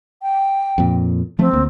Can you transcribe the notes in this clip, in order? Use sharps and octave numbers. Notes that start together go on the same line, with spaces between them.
G5
F2 A#2
F3 A3 C4
D2 A#3